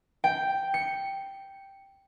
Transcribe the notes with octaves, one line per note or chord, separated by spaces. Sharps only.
G5
C#7